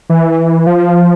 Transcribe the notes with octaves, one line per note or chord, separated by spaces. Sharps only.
E3
F3